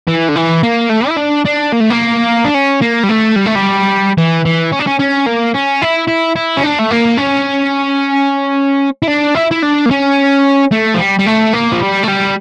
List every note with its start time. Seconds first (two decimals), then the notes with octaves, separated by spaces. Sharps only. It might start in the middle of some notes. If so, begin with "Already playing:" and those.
0.08 E3
0.29 D3
0.36 E3
0.63 A#3
0.90 A3
1.09 E4
1.17 D4
1.45 D4
1.72 A#3
1.80 A3
1.90 A#3
2.45 D4
2.54 C#4
2.81 A#3
3.03 G3
3.09 A3
3.36 G3
3.46 A3
3.55 G3
4.18 E3
4.45 E3
4.72 C#4
4.79 D4
4.87 C#4
4.99 C#4
5.26 A#3
5.54 C#4
5.82 E4
6.08 E4
6.36 E4
6.57 C#4
6.63 D4
6.79 A3
6.90 A#3
7.17 C#4
9.02 E4
9.07 D4
9.35 E4
9.51 E4
9.62 D4
9.86 A#3
9.90 C#4
10.71 A3
10.94 F3
10.99 G3
11.19 G3
11.26 A3
11.53 A#3
11.72 F3
11.81 G3
12.03 A3
12.08 G3